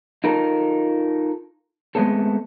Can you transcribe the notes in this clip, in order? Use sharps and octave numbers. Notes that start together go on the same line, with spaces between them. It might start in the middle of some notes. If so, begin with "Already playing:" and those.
D#4 F4 A4 A#4
G#3 A3 B3 C4 A4